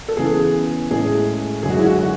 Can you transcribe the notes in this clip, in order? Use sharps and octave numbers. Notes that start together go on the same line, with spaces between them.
A4
C#3 E3 B3 G#4
A2 G#3 C#4 G#4
F#2 D3 G#3 G#4
F#4
E4
F#4
F#4